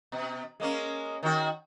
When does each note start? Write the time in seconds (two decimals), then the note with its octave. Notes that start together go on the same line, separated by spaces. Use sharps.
0.12 B2
0.60 G#3 A#3 C#4
1.23 D#3 F#4